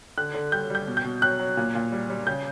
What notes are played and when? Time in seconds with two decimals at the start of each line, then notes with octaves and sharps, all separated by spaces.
0.18 D3 F#6
0.34 D3
0.52 G3 G6
0.70 G3 G6
0.87 B2
0.97 G6
1.04 B2
1.22 F#3 F#6
1.39 F#3
1.57 A#2
1.75 A#2
1.92 G3
2.10 G3
2.27 C#3 G6